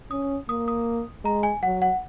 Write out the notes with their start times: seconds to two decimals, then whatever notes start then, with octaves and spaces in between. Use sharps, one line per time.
0.11 C#4 D#6
0.49 A#3 D#6
0.68 D#6
1.24 G#3 A#5
1.43 G#5
1.63 F#3 F#5
1.82 F#5